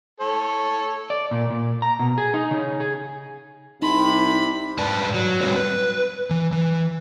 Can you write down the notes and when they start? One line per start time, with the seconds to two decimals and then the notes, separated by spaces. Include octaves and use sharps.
0.20 A4 C#5
1.10 D5
1.31 A#2
1.50 A#2
1.82 A#5
1.99 B2
2.18 G#4
2.34 D#4
2.51 C#3
2.80 G#4
3.82 C2 C3 D#4 B5 C6
4.79 G#2 B4 D5 A5
5.14 F#3
5.41 G3 C4 F#4 B4 C#5
5.56 B4
6.31 E3
6.52 E3